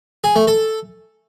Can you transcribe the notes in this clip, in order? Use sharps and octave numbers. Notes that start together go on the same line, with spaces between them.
G#4
A3
A4